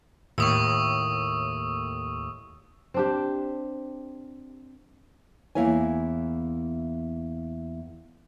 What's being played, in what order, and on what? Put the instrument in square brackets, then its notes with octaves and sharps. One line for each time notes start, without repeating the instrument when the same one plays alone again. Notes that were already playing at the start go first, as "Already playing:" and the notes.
[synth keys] D#2 A2 [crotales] C#6 D#6 E6
[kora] C4 D4 G4
[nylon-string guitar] E2 A#3 E4 C#5 G#5